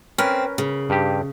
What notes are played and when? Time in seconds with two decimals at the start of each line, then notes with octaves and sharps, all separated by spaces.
0.18 C4 C#4 A#4 B4
0.58 C#3
0.90 G2 G4